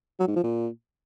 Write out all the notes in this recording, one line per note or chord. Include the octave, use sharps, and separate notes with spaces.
F#3
G#2
F3
A#2